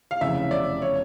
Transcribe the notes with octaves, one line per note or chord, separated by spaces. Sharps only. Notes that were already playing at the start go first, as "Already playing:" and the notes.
F5
F1 E2 C#3 E5
D5
C#5